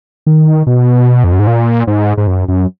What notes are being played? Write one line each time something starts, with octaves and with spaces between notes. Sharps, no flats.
D#3
B2
F2
F#2
G#2
A#2
G#2
G#2
F#2
F#2